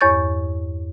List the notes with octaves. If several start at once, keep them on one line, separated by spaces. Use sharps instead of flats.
E2 G2 C#5 C#6 G6 A6